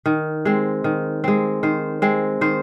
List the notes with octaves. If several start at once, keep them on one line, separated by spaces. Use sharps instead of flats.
D#3
G#3 C4
D#3
G#3 C4
D#3 C5
G#3 C4
D#3 C5